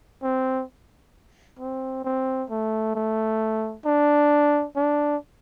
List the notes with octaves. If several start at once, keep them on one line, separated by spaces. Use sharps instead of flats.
C4
C4
C4
A3
A3
D4
D4